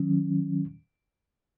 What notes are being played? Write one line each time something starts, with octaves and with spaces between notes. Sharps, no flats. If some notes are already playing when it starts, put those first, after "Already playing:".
Already playing: D#3 F#3 C#4